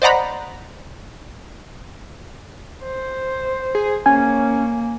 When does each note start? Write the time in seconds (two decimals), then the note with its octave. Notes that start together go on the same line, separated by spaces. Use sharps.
0.02 C5 D5 D#5 F#5 A#5 B5
2.83 C5
3.75 G#4
4.06 A#3 C#4 G#5